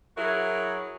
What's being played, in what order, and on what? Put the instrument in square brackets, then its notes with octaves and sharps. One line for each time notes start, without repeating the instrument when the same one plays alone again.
[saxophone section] F#3 E4 F#4 G#4 A#4